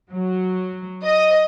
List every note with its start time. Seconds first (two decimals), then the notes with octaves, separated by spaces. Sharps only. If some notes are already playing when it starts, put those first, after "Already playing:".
0.12 F#3
1.03 D#5